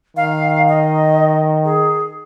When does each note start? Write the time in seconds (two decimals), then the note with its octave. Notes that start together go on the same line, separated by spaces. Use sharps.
0.17 D#3 F5
0.69 D#5
1.64 G#4